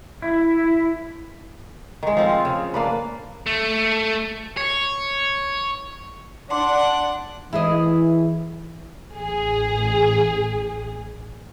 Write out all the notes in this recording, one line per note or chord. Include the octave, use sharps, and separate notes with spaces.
E4
D#3 G#3
F3 C4
F4
C#3
A#3 D4 B4
A3
C#5
D4 F#5 A5 C6 D6
E3 E4 G#4 D#5
A1 G#4